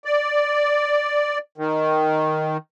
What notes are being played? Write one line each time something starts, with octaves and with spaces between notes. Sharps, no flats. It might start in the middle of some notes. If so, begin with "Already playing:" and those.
D5
D#3